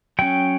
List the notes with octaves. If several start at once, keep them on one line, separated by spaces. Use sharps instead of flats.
F#3 C#4 G5